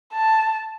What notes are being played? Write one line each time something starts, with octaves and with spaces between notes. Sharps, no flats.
A5